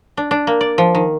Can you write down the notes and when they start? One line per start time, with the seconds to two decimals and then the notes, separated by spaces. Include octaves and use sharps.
0.17 D4
0.31 D4
0.47 A#3
0.61 D5
0.78 F3
0.95 D#3